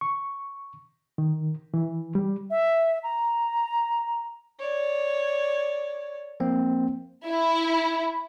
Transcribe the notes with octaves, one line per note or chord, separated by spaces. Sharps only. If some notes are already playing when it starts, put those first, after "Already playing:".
C#6
D#3
E3
G3
E5
A#5
C#5 D5
F3 A#3 C4
E4